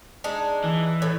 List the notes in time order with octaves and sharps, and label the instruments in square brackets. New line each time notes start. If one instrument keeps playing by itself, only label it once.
[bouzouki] G#3 D4 D#4
[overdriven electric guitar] E3
[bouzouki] A2